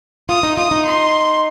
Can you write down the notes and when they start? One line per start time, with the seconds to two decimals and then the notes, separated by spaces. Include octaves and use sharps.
0.29 F4 D#6
0.43 D#4
0.57 F4 D#6
0.71 D#4
0.85 C6